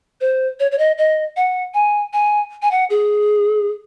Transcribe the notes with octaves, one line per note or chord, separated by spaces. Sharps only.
C5
C#5
C#5
D#5
D#5
F#5
G#5
G#5
G#5
F#5
G#4